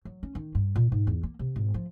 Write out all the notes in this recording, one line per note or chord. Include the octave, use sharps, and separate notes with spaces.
F#3
C#4
D#3
G2
A#2
G#2
E2
A#3
C3
G#1
F3